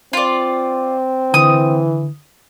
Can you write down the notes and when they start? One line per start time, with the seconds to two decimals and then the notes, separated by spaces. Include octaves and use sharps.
0.13 C4 F4 D5
1.34 D3 E3 D#6